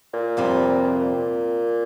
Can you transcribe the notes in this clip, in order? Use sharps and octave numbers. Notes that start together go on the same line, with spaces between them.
A#2
F2 C3 G3 C4 F4
A#2